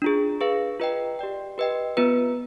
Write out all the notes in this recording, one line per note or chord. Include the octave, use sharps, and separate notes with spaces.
D4 F4 G#4
G#4 B4 F5
F4 B4 D#5 G5
G4 D5 G5
G4 B4 D#5 G5
B3 F4 B4